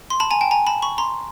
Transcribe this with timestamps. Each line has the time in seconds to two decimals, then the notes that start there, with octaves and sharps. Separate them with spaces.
0.10 C6
0.20 A5 B5
0.31 G#5 A#5
0.41 G5 A5
0.51 G#5 A#5
0.67 A5 B5
0.82 B5 C#6
0.98 A#5 C6